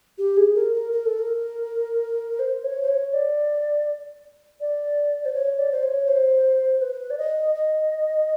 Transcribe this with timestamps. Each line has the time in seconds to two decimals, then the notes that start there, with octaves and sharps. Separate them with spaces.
0.18 G4
0.36 G#4
0.55 A#4
0.73 A#4
0.92 A#4
1.05 A4
1.18 A#4
2.39 C5
2.63 C#5
2.82 C5
2.88 C#5
3.13 D5
4.60 D5
5.25 C5
5.34 C#5
5.58 D5
5.71 C5
5.83 C#5
6.08 C5
6.81 B4
7.10 D5
7.18 D#5
7.55 D#5